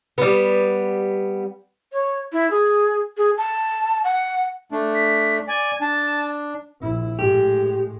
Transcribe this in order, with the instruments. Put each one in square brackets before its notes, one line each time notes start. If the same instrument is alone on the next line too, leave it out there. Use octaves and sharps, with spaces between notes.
[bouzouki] G3 B3
[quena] C#5
E4
G#4
G#4
A5
F#5
[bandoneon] A3 D4
[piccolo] B6
[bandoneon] D5 [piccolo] G#5
[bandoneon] D4 [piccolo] A5
[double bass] A#1 E4
[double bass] A2 G#3 [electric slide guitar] G4